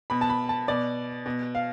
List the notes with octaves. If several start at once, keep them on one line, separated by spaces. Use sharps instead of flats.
B2 B5
A5
B5
A5
B2 D5
B2
F5